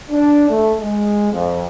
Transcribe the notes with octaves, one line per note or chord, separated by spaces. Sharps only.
D4
A3
G#3
F2